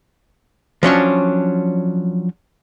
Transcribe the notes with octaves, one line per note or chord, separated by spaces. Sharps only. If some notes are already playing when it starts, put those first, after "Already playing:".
F3 F#3 C#4 D4